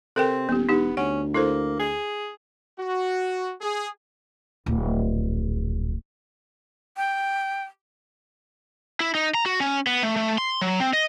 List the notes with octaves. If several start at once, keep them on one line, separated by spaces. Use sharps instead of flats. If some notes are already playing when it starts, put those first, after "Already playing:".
C3 C4 A4 A#4 G5
D#1 B3 G4
E1 B3 D#4 G4
D2 C#4 F#5
A#3 E4 A4 C5
G#4
F#4
G#4
D1 A#1
G5
E4
D#4
A#5
F#4
C#4
B3
A3
A3
C6
F#3
C4
D#5